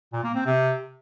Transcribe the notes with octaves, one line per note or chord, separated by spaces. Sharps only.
A#2
A#3
C4
C3